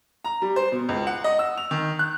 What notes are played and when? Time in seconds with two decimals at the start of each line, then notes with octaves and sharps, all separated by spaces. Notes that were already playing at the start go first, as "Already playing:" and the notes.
0.25 A#5
0.42 G3
0.56 C5
0.72 B2
0.89 C#2
1.07 F#5
1.24 D#5
1.39 E6
1.57 F7
1.71 D#3
1.99 F#6